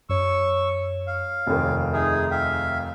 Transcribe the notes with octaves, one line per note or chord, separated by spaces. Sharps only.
F#2 C#5 C#6 E6
F5
F1 D#2
D#4 G#4 E5 G#6
E5 F5 G5